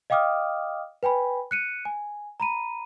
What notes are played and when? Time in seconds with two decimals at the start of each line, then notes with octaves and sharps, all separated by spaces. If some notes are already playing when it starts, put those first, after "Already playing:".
0.10 D#5 F5 G5 D6 D#6 F6
1.03 B4 G5 G#5 B5
1.51 F#6 C#7 D#7
1.85 G#5
2.40 A#5 B5 D#7